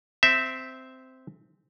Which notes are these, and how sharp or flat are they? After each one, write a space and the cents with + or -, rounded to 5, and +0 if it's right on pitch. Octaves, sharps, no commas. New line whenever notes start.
C4 -10 E5 +0